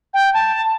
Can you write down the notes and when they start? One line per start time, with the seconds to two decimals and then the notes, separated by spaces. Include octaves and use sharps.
0.14 G5
0.34 A5